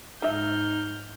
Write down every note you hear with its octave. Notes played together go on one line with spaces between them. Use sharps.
G#2 F3 D#4 E5 F6 G6